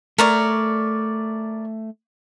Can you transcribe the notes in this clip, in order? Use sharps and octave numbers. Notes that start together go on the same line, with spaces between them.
A3 A#4 C#5 D5